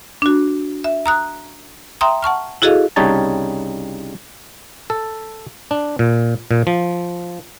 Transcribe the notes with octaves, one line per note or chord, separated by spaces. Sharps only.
D4 F#4
E5
A#5 D#6 F#6
E5 G5 A#5 C6 D#6
F#5 A5 C#6 F6
E4 F#4 G#4 A4 D#5 F5
C2 C#3 G3 D#4 C#5 A5
A4
D4
A#2
A#2
F3